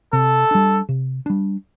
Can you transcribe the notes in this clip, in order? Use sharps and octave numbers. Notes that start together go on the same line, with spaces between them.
C3 A4
G3 D4
C3
G3 D4